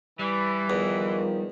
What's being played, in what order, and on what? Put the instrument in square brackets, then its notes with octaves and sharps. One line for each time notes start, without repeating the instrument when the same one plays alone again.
[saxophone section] E3 [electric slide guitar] G3
[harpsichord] E2 [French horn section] D#3 F3